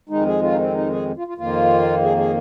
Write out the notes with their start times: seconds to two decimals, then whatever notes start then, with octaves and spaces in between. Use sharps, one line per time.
0.09 F2 D#3 G#3 D#4
0.26 G#4
0.42 F4
0.52 D#4
0.58 C4
0.73 D#4
0.90 G#4
1.17 F4
1.27 F4
1.38 F2 D#3 A#3 F4
2.03 G#4
2.17 G#4